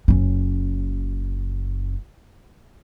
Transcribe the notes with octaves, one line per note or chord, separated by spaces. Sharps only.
F#1 C#4